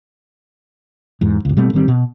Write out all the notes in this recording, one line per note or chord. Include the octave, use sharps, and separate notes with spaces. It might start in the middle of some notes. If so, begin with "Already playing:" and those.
E2 G#2
G1 C#2
B2 G3 A3 C4
A1 D#3 G3 C4
B2